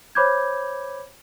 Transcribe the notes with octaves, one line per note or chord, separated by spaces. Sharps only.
C5 C#5 B5 D6 G6 G#6